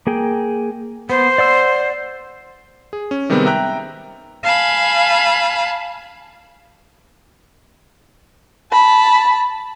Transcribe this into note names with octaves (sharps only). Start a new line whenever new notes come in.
A#3 G#4 G5
B3 C5
D5 F#5 E6
G#4
C#4
C3 D#3 G3 G#3 B3 C4
E5 G5 A#5 F#6
F5 G#5 A5 B5
A5 B5